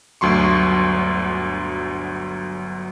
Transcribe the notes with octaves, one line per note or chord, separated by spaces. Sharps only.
G1 D2 F#3 C6 C#6